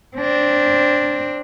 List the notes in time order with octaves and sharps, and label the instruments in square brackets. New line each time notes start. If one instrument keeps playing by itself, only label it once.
[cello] C4 D4